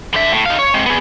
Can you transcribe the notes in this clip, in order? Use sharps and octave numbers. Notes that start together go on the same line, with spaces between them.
D3 E5
A2
D#4 F5
C#5
G#3 C4
B3 G#4